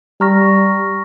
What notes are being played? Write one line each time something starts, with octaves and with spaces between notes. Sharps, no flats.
G3 A#5 C#6 F6 A#6